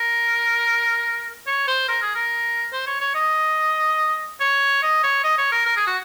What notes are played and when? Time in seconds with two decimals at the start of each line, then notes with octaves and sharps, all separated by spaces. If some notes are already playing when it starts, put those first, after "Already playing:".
Already playing: A#4
1.47 C#5
1.68 C5
1.88 A#4
2.02 G#4
2.15 A#4
2.72 C5
2.87 C#5
3.01 C#5
3.14 D#5
4.40 C#5
4.83 D#5
5.03 C#5
5.24 D#5
5.38 C#5
5.52 A#4
5.66 A#4
5.76 G#4
5.87 F#4